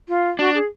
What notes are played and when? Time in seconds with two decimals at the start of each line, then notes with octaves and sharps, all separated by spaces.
0.08 F4
0.39 D4 F#4
0.54 G#4